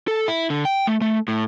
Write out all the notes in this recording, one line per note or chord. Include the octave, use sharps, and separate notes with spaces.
A4
E4
D3
G5
A3
A3
A2